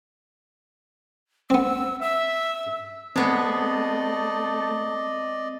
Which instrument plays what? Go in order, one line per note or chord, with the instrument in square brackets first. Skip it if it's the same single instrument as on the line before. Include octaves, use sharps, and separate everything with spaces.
[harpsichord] B3 C4 [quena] E6
[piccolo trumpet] E5 [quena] E6
[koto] G#3 B3 [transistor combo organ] A3 [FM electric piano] C4 [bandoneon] D5 D#5